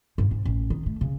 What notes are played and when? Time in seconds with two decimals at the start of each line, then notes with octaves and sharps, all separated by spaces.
0.18 G2
0.31 G#2
0.45 A1
0.70 D#3
0.86 A3
1.01 C#3